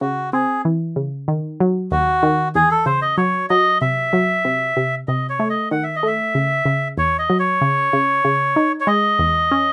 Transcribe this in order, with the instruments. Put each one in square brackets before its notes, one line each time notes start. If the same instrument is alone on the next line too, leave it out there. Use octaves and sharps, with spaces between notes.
[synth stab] C#3 [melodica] F#4
[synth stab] C4 [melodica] G#4
[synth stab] E3
C#3
D#3
F#3
[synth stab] D#2 [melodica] F#4
[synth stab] D#3
[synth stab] E2 [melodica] G#4
[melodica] A4
[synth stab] C#3 [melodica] C5
[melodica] D#5
[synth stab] F#3 [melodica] C#5
[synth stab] F#3 [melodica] D#5
[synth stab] C3 [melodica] E5
[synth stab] F#3
C3
C3
[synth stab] C3 [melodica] D#5
[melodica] C#5
[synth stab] A3
[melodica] D#5
[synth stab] D#3 [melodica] F#5
[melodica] E5
D#5
[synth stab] A3 [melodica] E5
[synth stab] C#3
C#3
[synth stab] E2 [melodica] C#5
[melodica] D#5
[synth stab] F#3
[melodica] C#5
[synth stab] C#3
C#3
C#3
D#4
[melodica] C#5
[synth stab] G#3 [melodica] D#5
[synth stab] E2
C#4